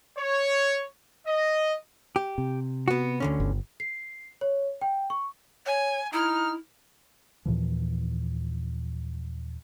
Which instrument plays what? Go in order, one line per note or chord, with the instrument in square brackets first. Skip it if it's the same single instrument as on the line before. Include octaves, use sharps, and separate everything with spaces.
[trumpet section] C#5
D#5
[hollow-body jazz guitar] G4
[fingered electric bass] C3
[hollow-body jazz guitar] B3 F#4
D2 D3 C#4
[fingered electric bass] G1
[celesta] C7
C#5
G5
C#6
[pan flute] C#5 [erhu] G#5
[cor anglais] D#4 [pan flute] E4 [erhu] F6
[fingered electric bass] D#2 A#2 E3 F3